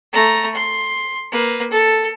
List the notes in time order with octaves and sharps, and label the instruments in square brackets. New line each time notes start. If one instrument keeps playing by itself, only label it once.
[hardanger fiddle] A3 A#5
C6
A#3 B4
A4